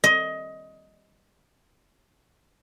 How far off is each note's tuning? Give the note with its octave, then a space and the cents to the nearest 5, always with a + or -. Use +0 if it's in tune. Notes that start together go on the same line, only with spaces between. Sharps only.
D#5 +20